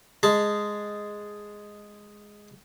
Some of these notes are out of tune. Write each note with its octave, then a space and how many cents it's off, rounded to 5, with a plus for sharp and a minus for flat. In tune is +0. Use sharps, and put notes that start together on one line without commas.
G#3 +0 A5 +0